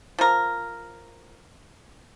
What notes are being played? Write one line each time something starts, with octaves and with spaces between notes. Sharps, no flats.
F3 A#4